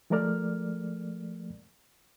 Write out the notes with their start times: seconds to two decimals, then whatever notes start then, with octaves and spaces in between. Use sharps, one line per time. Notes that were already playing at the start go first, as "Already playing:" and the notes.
0.10 F3 G#3 A3 A#4 D5 F6